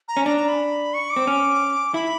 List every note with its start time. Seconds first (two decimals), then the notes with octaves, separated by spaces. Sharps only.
0.08 A#5
0.17 C#4
0.26 D4 A#5
0.37 A#5
0.48 B5
0.94 C#6
1.10 D6
1.16 C4
1.27 C#4
1.94 E4 B5